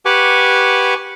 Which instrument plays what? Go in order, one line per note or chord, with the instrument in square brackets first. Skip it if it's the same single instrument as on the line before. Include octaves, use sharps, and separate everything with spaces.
[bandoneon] G4 B4 F#5 G#5 C#6 D6